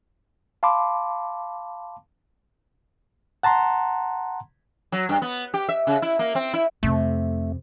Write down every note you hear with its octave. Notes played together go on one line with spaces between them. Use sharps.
F5 A5 B5 C6 D6
F#5 A5 A#5 C6
F#3
G2
B3
G4
E5
C#3
E4
A#3
C4
E4
F2 C3 A3